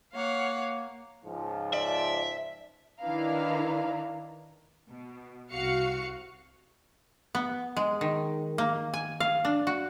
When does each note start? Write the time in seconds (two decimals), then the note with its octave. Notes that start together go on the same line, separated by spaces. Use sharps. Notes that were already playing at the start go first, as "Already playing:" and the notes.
0.15 A#3 C#5 F5 F#5
1.24 C#2 G#2 F3
1.73 D5 E5
3.00 D#3 D4 E4 B4 F5 A#5
4.90 B2
5.52 C2 F#4 F5 C#7
7.35 B3
7.76 G#3
8.01 D#3
8.58 A#3
8.94 G#5
9.20 F5
9.45 D4
9.67 F#4